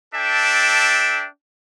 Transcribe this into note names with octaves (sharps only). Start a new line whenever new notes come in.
D4 A4 E5 G5